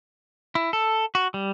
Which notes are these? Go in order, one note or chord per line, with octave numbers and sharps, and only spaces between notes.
E4
A4
F#4
G3